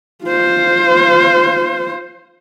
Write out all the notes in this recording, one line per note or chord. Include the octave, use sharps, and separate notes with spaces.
F4 C5